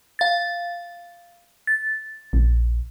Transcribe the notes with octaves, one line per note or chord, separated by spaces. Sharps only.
F5 A6
A6
A#1